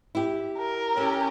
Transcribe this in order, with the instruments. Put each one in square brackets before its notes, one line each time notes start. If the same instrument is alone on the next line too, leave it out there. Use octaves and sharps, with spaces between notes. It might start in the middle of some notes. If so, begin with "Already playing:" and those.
[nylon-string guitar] E4 G4
[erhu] A#4
[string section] C#4 G4 [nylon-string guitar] A4